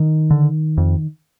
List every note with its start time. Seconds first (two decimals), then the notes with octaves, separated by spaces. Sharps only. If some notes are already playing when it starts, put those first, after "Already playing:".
Already playing: D#3
0.31 D3
0.78 F2